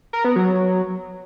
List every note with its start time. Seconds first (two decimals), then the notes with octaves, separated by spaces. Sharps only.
0.13 A#4
0.25 B3
0.36 F#3